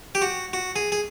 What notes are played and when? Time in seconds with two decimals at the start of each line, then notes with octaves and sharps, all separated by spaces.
0.15 G4
0.22 F#4
0.53 F#4
0.76 G#4
0.92 G#4